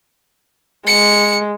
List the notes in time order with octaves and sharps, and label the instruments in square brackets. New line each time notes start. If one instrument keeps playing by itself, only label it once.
[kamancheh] G#3 [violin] C#7